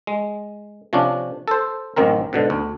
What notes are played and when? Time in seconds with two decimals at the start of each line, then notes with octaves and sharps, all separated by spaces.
0.07 G#3
0.93 C3 F3 C#4 D4
1.48 A4 C5
1.96 A1 F#2 D#3 C4 A#4
2.33 G#2 B2 D3
2.50 D2